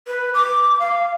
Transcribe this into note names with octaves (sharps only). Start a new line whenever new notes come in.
B4
D6
F5